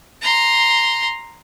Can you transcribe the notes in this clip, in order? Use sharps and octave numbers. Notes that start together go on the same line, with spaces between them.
A#5 C6